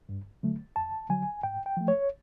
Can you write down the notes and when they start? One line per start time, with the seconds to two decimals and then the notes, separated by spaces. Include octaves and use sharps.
0.09 G2
0.43 D3 F#3 A3
0.76 F2 A5
1.10 D3 F#3 G#5
1.43 G#2 G5
1.66 G5
1.77 F3 A3
1.88 C#5